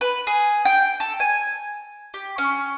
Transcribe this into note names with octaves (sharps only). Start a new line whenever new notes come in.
B4
G#4
G5
A4
G#5
G4
C#4